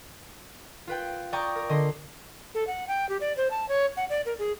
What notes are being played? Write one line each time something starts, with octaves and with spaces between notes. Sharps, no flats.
F4 B4 G5
D5 G5 A#5 C#6 D#6
A#4
D3 D#5 C6
A4
F#5
G5
G4
D5
C5
A5
C#5
F#5
D5
A#4
G#4